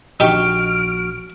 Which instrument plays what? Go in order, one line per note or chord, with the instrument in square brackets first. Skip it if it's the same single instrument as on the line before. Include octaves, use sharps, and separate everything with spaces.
[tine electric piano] A#1 F#4 C#6 [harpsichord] D#4 G4 [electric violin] F6 D7